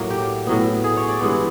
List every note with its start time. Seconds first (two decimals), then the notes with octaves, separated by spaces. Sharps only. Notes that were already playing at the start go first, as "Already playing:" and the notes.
Already playing: A2 F#3 A#3
0.10 G4
0.47 A2 F#3 B3
0.84 G#4
0.97 C#5
1.08 D5
1.21 G2 E3 G#3 B3